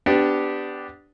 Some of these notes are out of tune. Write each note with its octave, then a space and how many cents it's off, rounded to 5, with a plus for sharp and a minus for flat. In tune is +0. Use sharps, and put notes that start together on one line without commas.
B3 +20 D4 +0 G4 +0